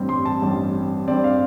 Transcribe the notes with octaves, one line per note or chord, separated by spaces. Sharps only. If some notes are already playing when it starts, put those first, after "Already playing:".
Already playing: A1 G2 G3 C4
C6
A5
A1 G2 G3 C4
G2 G3 C4 D5
F5